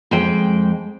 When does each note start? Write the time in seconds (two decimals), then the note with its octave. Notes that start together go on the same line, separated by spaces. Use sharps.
0.11 F2 G#3 G5